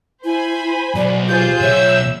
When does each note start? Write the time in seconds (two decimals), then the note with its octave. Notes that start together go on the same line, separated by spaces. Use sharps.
0.24 E4 C5 G#5 B5
0.96 B1 D5
1.28 F4 G4 G#4 C5 G6
1.61 B1 C#5 E5 E6